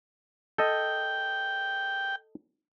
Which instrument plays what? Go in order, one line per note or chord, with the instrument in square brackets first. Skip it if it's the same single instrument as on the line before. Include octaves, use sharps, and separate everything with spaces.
[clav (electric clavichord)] A4 D#5 [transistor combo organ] G5